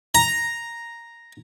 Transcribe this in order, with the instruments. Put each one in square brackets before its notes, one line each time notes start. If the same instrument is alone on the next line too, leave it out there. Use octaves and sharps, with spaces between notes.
[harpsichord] A#5